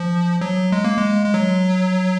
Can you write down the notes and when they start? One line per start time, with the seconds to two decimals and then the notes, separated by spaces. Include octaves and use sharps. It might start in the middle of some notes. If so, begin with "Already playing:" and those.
Already playing: F3
0.41 F#3
0.72 G#3
0.84 A#3
0.97 G#3
1.26 G#3
1.34 F#3